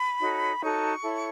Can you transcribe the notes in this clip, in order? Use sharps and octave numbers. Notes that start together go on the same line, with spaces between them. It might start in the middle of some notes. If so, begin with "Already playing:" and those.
Already playing: B5
D#4 F#4 A4 C#5
D#4 F#4 A4 C#5 C#6
E4 A4 C#5